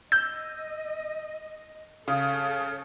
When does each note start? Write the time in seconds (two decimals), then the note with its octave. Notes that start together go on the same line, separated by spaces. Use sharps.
0.12 D#5 E6 G6
2.08 C#3 A4 C#5 F5 D#6